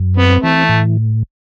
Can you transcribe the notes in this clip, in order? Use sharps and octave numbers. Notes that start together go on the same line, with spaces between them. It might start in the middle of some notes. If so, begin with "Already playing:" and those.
Already playing: F#2
B3 C4
E3 A3
A2